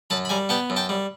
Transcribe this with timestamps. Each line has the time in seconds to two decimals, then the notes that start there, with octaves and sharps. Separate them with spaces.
0.10 F#2 A5 B5
0.25 B5
0.29 G3 G#5 A#5
0.49 B3 G5 A5
0.70 F#2
0.76 G5 A5
0.89 G3